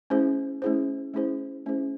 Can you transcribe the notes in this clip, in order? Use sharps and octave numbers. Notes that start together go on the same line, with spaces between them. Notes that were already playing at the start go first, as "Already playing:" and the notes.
A3 C#4 E4 G#4 C5
A3 C#4 E4 G#4 C5
A3 C#4 E4 G#4 C5
A3 C#4 E4 G#4 C5